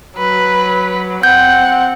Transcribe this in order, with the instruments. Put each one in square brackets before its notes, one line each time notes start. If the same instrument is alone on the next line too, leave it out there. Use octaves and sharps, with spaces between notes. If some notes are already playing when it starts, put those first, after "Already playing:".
[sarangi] F#3 [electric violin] B4
[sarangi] C4 [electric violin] F#5 [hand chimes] G6